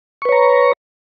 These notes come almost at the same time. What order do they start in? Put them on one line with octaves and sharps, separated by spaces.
C#6 B4 C#5 A#5